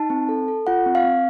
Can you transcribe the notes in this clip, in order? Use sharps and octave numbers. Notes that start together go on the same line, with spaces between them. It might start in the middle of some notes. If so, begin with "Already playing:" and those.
Already playing: D#4 A5
C4
A4
A4
F4 F#5
C4
F5
C4